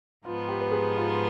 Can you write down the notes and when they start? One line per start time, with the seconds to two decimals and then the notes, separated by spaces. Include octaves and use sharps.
0.24 G#2 F3 B3 D#4 F4
0.49 G4
0.61 B4
0.72 G#4
0.96 F4